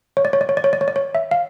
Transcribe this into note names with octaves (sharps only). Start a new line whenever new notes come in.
C#5
D5
C#5
D5
C#5
D5
C#5
D5
C#5
D5
C#5
E5
F5